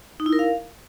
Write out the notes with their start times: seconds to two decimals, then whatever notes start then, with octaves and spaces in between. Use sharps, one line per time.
0.20 D#4
0.26 E4
0.33 A#4
0.39 F5